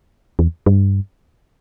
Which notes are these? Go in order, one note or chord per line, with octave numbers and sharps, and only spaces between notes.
E2
G2